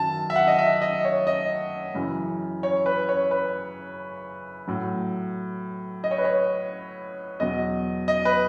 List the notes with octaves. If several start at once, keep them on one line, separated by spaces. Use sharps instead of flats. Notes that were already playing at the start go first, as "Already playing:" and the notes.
Already playing: F#2 D#3 F#3 A5
E5
F#5
D#5
E5
D#5
C#5
D#5
F#2 C#3 E3
C#5
B4
C#5
B4
A2 F#3
D#5
C#5
B4
C#5
E2 B2 F#3 D#5
D#5
B4